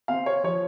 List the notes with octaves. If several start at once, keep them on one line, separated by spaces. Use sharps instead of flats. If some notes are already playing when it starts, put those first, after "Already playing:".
C4 F5
C#5
F3 C#5